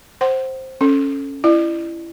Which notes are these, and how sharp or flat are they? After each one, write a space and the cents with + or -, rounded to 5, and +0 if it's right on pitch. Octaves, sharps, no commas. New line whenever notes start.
C5 +10 F#5 +25 C6 +0
C#4 -10 A4 +0
E4 +20 D5 +40